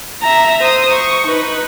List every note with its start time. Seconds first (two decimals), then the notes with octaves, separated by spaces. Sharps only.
0.22 E5 A#5
0.61 C5 D#6
0.93 C#6
1.27 D#4 B4